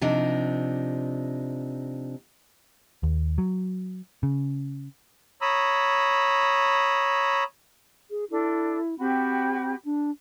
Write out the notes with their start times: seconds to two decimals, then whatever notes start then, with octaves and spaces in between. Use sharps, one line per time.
0.01 C3 F3 D4 D#4
3.03 D#2
3.38 F#3
4.23 C#3
5.41 C#5 A#5 B5 D#6 E6
8.10 G#4
8.30 D4 E4 A4
8.99 C4 F#4 G4 B5
9.85 D4